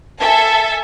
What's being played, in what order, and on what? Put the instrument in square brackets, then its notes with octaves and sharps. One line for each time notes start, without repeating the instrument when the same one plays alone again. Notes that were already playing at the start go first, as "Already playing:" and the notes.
[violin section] A4 E5 G#5 A5